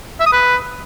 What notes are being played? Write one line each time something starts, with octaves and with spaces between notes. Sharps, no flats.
E5
D#6
B4